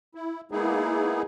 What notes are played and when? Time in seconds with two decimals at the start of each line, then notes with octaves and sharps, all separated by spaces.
0.15 E4
0.52 G#3 A#3 B3 D#4 E4 G#4